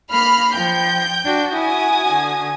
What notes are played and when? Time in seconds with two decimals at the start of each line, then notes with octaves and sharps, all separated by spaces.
0.11 A#3 B5 F6 C7
0.55 F3 G5 G6
1.24 D4 F#4
1.54 E4 F#4 G#5 D#6
2.08 D3